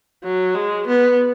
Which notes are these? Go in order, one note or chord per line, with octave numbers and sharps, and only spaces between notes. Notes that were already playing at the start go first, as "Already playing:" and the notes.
F#3
G#3
B3